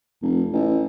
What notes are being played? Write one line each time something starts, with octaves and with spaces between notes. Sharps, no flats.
F1
A1